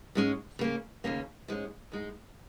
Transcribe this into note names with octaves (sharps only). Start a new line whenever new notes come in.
G#2 G#3 C#4
C#3 A#3 C#4
D#2 C#3 A#3 C#4
G#2 G#3 C#4
G#2 G#3 D#4